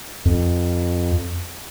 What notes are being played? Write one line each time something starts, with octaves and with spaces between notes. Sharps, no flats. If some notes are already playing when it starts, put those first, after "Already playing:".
F2